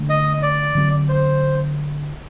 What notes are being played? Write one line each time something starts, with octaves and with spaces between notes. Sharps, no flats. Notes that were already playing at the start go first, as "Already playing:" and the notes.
Already playing: D3 A3 D4
D#5
D5
D3 F#3 C4
C5